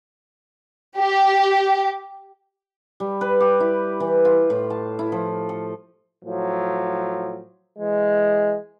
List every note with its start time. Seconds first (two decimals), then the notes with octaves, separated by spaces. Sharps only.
0.97 G4
3.00 G3
3.21 B4
3.40 G4
3.60 E4
4.00 E3
4.25 F4
4.50 A2
4.70 A5
4.99 E4
5.12 F3
5.49 A4
6.24 A2 F3 F#3
7.79 E3 G#3